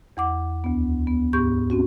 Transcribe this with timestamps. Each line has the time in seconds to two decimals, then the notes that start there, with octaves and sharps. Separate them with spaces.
0.17 E2 F#5 D6
0.64 D2 B3
1.07 B3
1.33 G#2 B3 G4 C#6 G6
1.70 C4 C#4 F#4